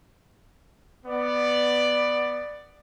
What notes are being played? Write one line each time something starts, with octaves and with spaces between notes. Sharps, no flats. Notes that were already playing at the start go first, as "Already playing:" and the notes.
B3 D5